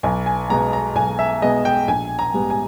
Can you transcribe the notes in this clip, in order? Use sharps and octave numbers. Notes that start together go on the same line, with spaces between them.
B1 G#5
G#5
B2 G#3 B3 A#5
A#5
B1 G#5
E5
B2 G#3 B3 D#5
G5
A#1 G#5
A#5
G#2 G3 B3
G#5